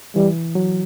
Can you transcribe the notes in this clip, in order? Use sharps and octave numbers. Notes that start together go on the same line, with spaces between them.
E3 G3
F#3